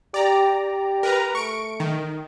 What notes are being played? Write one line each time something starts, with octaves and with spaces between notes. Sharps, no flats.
G4 D5 A#5
G4
A#4 B4 A#5
A3 C#6 D7
D#3